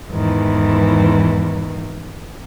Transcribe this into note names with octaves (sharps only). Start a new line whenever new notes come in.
E2 G#2 D#3 E3